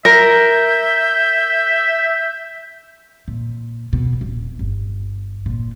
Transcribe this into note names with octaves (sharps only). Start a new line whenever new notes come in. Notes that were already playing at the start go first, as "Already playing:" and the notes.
A#4 E5 G6
A#2
B2
D#1
G1
A#2